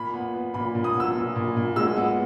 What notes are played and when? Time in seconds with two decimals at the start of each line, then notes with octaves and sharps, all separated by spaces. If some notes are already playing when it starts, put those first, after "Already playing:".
Already playing: A#2 B5
0.14 B3
0.34 B3
0.54 A#2 B5
0.75 A#2
0.84 D#6
0.95 B3 E6
1.15 A#2
1.36 A#2
1.56 A#2
1.76 G#3 E6
1.97 B3